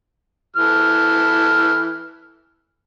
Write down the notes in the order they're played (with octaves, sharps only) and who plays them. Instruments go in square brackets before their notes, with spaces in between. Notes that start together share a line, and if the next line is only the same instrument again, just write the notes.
[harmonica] E3 A4 F6